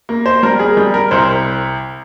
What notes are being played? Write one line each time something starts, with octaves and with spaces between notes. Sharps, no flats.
A#3
C5
G3 A#4
G#4
G3
A#4
C2 C5